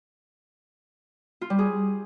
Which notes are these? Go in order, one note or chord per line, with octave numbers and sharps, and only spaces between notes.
F4
G3
G#4